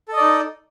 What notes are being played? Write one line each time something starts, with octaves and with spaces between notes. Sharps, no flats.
D#4 A4 D5 D#5